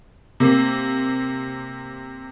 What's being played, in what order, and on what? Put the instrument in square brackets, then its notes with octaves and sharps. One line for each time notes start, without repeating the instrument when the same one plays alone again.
[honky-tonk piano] C3 A#3